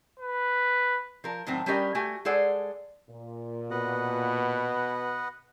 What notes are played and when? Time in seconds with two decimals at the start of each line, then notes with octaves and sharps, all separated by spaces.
0.20 B4
1.24 F3 A#4
1.47 A2 D#3 F#3 C4
1.66 G3 C#4 D4 G4 A#4 D#5
1.95 A3 F#4 G4 G#5
2.25 G#3 G#4 A4 C5 D5 F#5
3.09 A#2
3.71 B2 B4 D#5 F#5